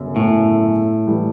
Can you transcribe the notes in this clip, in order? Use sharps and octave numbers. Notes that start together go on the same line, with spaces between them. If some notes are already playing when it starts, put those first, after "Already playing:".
Already playing: G1 F#2 C#3
A2
E3 G3